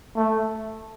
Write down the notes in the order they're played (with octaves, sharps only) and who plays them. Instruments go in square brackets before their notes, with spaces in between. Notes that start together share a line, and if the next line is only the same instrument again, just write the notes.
[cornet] A3